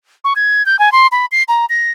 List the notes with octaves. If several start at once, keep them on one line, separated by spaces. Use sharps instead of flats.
C#6
G#6
G6
G#5
C6
B5
C7
A#5
A#6